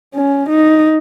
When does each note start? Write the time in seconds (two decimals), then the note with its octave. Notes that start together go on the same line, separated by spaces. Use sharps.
0.15 C#4
0.49 D#4